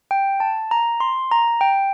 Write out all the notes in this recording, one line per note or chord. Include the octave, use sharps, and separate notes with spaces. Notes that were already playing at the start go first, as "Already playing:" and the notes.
G5
A5
A#5
C6
A#5
G5